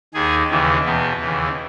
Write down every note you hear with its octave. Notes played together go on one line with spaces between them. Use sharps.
D#2 D#3 G#4
D#2 C#3 E3
E2 B2 B3
D#2 C#3 E3